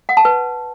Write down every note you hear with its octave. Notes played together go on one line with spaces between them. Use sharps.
F#5
A5
B4